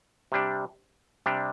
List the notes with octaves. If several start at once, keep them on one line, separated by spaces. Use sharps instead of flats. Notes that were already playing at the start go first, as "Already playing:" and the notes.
C3 G3 D4
C3 G3 D4